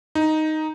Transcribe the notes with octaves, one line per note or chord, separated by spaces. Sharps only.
D#4